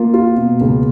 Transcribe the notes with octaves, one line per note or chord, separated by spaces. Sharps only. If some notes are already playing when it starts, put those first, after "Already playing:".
Already playing: A#3 F4
F4
B2
C#2